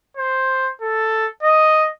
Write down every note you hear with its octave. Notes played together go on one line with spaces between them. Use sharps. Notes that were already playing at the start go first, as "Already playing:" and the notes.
C5
A4
D#5